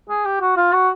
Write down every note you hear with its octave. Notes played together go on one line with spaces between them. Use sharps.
G#4
G4
F#4
F4
F#4